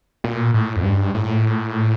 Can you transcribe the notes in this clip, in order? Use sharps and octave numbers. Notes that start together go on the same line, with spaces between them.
A#2
A2
F2
G2
A2